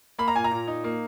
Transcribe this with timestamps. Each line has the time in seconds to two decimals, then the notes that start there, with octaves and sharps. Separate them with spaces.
0.19 A#3 B5
0.28 A#5
0.35 A#2 G#5
0.44 A#5
0.51 A#2
0.67 D#4
0.84 A#3